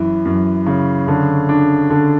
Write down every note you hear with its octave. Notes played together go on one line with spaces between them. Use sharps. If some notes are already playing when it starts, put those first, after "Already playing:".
Already playing: F#2 E3
F#2
C#3
D3
D4
D3